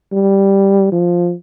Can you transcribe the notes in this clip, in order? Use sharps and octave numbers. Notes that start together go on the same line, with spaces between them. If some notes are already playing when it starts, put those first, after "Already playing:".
G3
F3